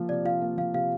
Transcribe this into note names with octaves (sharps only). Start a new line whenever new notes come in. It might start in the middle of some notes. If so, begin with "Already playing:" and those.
Already playing: F3 A#3 F4
C3 D5
F4 F5
A#3
F3 F5
C3 F5